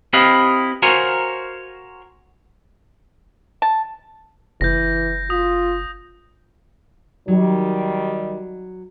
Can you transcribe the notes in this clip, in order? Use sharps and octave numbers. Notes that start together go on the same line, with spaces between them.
C4 E4 G4 B4 D#5 F5
F#4 A#4 C5 C#5 F5 G#5
A5
F#1 E3 G6 A#6
F4 D#6
D#3 F#3 G3